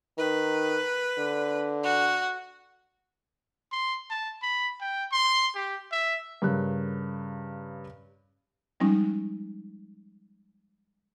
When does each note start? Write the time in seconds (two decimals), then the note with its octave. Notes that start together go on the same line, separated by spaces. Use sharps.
0.18 D#3 B4
1.18 D3
1.83 F#4
3.72 C6
4.10 A5
4.42 B5
4.81 G5
5.12 C6
5.55 G4
5.91 E5
6.42 G2 C#3 A#4 F#6
8.80 F3 G3 G#3 C#4 D#4